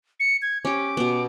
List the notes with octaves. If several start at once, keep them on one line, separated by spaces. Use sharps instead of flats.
C#7
G#6
C#4 G4 D6
B2 B3